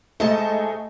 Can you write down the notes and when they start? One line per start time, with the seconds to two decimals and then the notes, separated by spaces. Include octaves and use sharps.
0.20 G#2 A3 G#4 D#5 A5